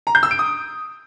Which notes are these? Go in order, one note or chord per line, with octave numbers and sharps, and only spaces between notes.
A#5
G6
E6
D7
D#6